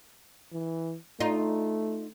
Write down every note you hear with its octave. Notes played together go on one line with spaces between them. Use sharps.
E3
A3 D#4 F4